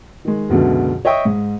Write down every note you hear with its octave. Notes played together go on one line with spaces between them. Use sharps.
D#3 G#3
C#2 F#2 B2 D3
C#5 D#5 E5 G5 C#6 D#6
G#2